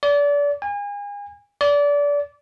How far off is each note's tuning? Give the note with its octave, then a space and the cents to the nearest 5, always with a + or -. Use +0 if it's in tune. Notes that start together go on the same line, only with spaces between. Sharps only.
D5 -30
G#5 -35
D5 -25